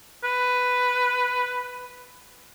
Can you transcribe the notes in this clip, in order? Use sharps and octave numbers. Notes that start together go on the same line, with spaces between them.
B4